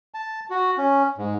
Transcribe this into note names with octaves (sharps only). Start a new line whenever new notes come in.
A5
F#4
C#4
G#2